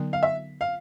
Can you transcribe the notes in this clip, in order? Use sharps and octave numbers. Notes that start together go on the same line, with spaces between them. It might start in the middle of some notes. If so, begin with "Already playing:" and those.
Already playing: D3 F#3 B3 D#4
F5
E5
F5